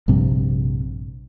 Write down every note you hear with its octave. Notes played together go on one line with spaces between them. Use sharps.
A#1 G2 C3